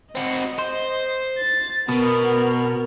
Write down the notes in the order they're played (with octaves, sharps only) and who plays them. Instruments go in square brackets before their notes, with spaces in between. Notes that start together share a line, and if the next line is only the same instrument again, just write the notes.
[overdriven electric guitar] C4 F#4 [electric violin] D#5
[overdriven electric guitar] C5
[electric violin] A6
[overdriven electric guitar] B2 [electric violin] B3 A#4